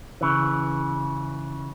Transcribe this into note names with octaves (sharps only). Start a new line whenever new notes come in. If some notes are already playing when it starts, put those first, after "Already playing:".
C#3 E3